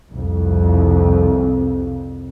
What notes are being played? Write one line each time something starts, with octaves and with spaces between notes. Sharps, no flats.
C2 F2